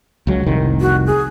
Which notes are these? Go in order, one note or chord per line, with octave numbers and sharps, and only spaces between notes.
C#2 F#3
F1 C2 D#3
F#4
G#4